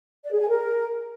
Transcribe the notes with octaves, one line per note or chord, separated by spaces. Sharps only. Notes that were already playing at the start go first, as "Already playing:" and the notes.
D5
G#4
G#5
A#4